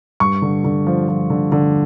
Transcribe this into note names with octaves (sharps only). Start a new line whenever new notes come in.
G2 C#6
D3
D3
F3
F3
D3
D3